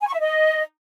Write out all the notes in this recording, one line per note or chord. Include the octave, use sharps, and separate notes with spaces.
G#5
C#6
E5
D#5